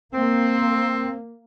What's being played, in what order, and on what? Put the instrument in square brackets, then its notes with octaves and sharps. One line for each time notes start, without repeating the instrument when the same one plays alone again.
[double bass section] A#3 [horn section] C4